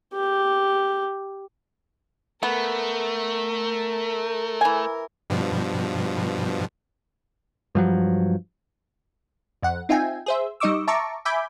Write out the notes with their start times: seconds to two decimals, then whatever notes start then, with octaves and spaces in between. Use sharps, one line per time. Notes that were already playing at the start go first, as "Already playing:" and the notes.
0.14 G4
2.43 A3 B3 A#4
4.61 E3 G#5
5.30 G2 B2 F3
7.75 G2 F3 F#3
9.63 F2 F#5
9.89 C4 D#4 F4 E5 G5 G#5
10.26 G#4 C5 E5
10.60 G3 D#4 D#5 C#6 D6 E6
10.87 E5 A5 A#5 C#6 D6
11.25 E5 G#5 B5 D6 G6